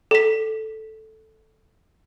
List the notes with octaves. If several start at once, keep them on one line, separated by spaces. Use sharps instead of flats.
A4 B6